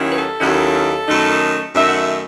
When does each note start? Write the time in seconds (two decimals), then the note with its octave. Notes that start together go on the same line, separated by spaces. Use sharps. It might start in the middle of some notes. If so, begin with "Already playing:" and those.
Already playing: D#2 D#3 F#3 C#4 E4
0.10 B4
0.17 A4
0.40 D#2 D#3 F#3 C#4 E4
1.07 F#2 D#3 A3 D#4
1.74 F#2 D#3 A3 D#4 E5
1.87 F#5
1.97 E5